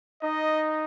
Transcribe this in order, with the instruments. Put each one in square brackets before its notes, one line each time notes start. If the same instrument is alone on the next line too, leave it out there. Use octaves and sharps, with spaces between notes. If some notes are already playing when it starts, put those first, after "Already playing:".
[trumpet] D#4 [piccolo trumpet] D#5